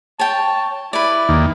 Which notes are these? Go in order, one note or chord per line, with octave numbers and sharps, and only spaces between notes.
C#5 G5 A5
E4 B4 D5
D#2